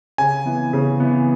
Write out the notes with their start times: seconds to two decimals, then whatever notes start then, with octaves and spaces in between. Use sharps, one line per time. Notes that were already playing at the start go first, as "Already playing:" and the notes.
0.18 C#3 G#5
0.46 E3 B3
0.73 C#3
1.00 E3 B3